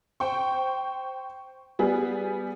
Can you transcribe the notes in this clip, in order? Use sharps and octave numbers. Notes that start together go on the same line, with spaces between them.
C5 G5 C#6
G3 B3 G#4